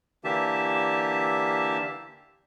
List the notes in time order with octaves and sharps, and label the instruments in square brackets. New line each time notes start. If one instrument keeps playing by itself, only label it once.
[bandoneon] D3 E3 A#3 G4 E5 A5